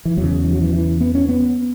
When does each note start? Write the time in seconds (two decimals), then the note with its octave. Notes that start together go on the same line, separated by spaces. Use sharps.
0.05 E3
0.17 E2 C#3 F#3
0.45 E3
0.53 F#3
0.62 E3
0.73 E3
1.01 B3
1.15 C#4
1.29 B3